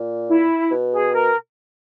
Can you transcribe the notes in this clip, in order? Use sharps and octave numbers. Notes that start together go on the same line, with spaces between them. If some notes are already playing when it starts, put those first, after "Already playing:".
Already playing: A#2
E4
B2
G#4
A#4